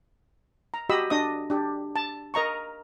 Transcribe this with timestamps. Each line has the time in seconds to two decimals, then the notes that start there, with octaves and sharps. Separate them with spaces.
0.74 A#5
0.89 F#4 G4 D#5 B5 E6
1.10 D4 D#5 D#6
1.50 D4 G4
1.96 A5
2.34 A#4 D#5 A#5 C#6